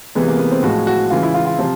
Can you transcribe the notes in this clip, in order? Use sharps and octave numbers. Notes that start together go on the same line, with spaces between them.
C3 E3 G#3 B3
A#3
B3
C4
A2 F3 G#3 F#4
F#4
C#3 E3 G#3 F4
E4
F4
F4
C3 F3